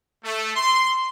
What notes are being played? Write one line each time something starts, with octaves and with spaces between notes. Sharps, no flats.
A3
C6